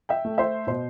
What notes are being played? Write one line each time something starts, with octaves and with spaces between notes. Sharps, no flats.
E5 G5
A3
C5 E5
B2 C5